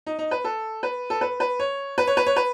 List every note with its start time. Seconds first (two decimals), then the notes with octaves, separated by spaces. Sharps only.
0.07 D#4
0.19 D#4
0.31 B4
0.44 A4
0.83 B4
1.10 A4
1.21 B4
1.40 B4
1.60 C#5
1.98 B4
2.07 C#5
2.17 B4
2.26 C#5
2.36 B4